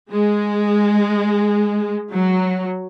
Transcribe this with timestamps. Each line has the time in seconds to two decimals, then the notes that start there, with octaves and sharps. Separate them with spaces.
0.12 G#3
2.12 F#3